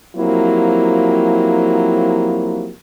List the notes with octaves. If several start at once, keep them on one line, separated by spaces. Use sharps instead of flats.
F3 F#3 A#3 C4 E4 G4